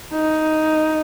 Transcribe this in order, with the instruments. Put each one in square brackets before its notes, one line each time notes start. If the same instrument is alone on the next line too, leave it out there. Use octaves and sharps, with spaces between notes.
[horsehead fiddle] D#4